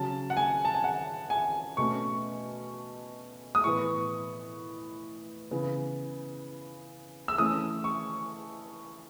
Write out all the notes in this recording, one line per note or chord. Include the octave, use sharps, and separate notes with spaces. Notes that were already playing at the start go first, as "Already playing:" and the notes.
Already playing: C#3 F#3 C#4 A5
F#5
G#5
A5
G#5
F#5
G#5
B2 A3 C#4 C#6
D#6
A2 E3 B3 C#6
C#3 E3 B3
E6
E3 A3 C#4 D#6
C#6